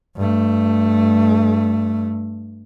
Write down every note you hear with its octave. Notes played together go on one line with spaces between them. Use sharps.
G2 A3